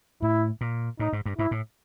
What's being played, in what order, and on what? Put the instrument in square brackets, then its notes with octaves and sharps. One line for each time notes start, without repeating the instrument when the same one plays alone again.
[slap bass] A2 [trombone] E4
[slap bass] A#2
[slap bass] A2 [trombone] D#4
[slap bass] G#2
G2
[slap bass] G#2 [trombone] E4
[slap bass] A2